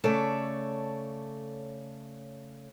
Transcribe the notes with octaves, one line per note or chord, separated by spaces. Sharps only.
C#3 A3 A4 C#5 D5 A5